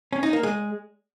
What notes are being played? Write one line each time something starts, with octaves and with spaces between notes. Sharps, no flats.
C#4
D#4
A#3
G#3